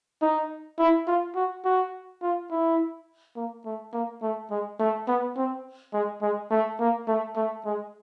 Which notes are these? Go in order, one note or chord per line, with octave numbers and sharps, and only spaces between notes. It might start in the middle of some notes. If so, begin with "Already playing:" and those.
D#4
E4
F4
F#4
F#4
F4
E4
A#3
A3
A#3
A3
G#3
A3
B3
C4
G#3
G#3
A3
A#3
A3
A3
G#3